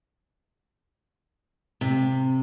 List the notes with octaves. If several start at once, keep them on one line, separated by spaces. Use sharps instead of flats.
C3